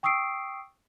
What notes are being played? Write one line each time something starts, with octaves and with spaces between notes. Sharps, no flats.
G5 C#6 D#6 E6 C7 D7